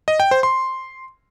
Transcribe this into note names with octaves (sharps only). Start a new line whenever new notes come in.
D#5
G5
C5
C6